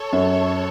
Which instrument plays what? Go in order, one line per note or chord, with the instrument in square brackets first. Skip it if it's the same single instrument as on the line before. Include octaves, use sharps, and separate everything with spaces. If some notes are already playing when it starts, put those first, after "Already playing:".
Already playing: [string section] A4 C#5
[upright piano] F#2